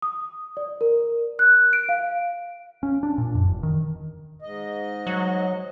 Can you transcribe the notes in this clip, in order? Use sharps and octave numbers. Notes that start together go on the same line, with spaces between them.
D#6
D5
A#4
F#6
D7
F5
C#4
D4
A#2
F#2
E1
D#3
G#2 D#5
F#3